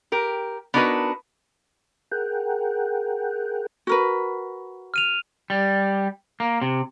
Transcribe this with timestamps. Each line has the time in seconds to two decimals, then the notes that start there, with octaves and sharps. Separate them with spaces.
0.12 G4 A#4
0.74 B3 D4 D#4 F#4 A#4 B4
2.12 G#4 A#4 F#5 G5
3.87 F#4 A#4 B4
4.94 F6 D#7 F7
5.50 G3
6.40 A#3
6.61 C3